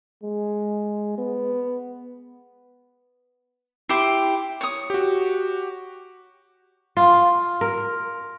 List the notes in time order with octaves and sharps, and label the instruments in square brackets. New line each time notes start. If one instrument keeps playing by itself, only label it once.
[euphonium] G#3
B3
[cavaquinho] E4 G4 C6 [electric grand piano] C7
[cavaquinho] C#5 D#6
[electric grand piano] F#4 G4
[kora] F4
A#4